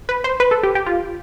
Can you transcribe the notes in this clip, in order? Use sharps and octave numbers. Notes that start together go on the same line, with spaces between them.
B4
C5
B4
A4
G4
G4
F4